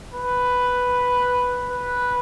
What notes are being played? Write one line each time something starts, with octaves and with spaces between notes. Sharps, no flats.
B4
B4